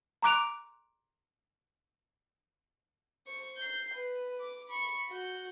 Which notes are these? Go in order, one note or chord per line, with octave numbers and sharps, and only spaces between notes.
A#5 C6 D6 F#6 D7 F7
C5 C#6
G6 C7
B4
D6
B5 C#6
F#4 G6